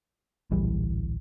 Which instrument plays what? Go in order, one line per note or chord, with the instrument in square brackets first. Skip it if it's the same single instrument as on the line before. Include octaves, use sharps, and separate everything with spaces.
[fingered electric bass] D1 A#1 E3 G3